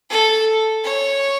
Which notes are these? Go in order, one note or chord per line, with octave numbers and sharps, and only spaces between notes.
A4
C#5